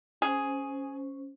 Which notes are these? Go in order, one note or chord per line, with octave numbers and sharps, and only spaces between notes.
C#4 G#4 C5